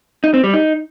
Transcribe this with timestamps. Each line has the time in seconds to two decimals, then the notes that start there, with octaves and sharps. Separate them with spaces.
0.24 D#4
0.34 C4
0.44 G3
0.54 D#4